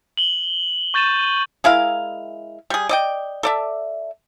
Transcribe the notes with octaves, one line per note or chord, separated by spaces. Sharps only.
F#7 G7
C#6 G6 A6 D#7 E7
G#3 E4 A#4 F5
G3 G#4
D5 D#5 G5
A4 D5 E5